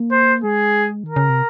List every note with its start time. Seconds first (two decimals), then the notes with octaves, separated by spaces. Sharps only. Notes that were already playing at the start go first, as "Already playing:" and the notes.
Already playing: A#3
0.11 C5
0.44 G#3 G#4
1.04 D#3
1.09 A#4
1.16 C#3
1.29 C3